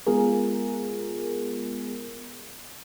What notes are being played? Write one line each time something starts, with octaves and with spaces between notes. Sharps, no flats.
G#3 B3 F4 G#4 A#4